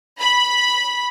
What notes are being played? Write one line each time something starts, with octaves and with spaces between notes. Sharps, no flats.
B5